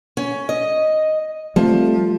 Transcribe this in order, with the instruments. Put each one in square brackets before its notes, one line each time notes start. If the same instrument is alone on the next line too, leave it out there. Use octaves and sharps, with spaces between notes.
[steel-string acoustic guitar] C#4
D#5
[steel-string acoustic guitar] F3 [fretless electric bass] G3 A3 C4